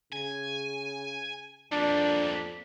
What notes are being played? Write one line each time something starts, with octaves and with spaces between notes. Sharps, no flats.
C#3 G#5
F2 G3 A#3 D4